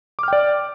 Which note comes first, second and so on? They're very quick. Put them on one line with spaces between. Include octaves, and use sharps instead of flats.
D6 F6 G5 D5